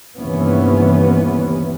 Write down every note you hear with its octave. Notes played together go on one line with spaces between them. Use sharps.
G1 D#2 C3 E3 B3 C#4